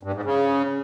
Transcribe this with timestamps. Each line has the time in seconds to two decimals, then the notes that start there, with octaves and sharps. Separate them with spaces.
0.03 G2
0.14 G#2
0.25 C#3